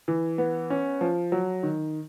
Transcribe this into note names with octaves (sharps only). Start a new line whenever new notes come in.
E3
B3
C#4
F3
F#3
D#3